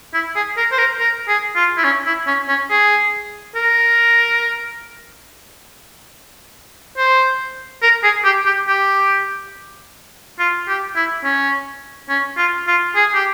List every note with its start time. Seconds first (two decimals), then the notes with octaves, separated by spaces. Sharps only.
0.14 E4
0.35 G#4
0.57 A#4
0.72 C5
0.78 A#4
1.00 A#4
1.28 G#4
1.56 F4
1.78 E4
1.84 C#4
2.06 E4
2.27 C#4
2.48 C#4
2.71 G#4
3.55 A#4
6.97 C5
7.82 A#4
8.04 G#4
8.25 G4
8.46 G4
8.68 G4
10.39 F4
10.68 G4
10.96 E4
11.24 C#4
12.09 C#4
12.38 F4
12.67 F4
12.96 G#4
13.14 G4